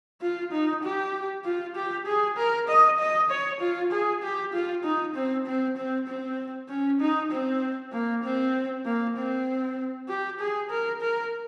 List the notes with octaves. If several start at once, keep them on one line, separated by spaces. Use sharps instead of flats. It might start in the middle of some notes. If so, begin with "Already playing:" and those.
F4
D#4
G4
F4
G4
G#4
A#4
D#5
D#5
C#5
F4
G#4
G4
F4
D#4
C4
C4
C4
C4
C#4
D#4
C4
A#3
C4
A#3
C4
G4
G#4
A#4
A#4